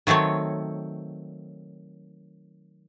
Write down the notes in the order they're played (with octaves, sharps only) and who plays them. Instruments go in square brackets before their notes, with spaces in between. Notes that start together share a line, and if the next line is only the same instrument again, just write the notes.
[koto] D#3 F#3 A3 C4 C#5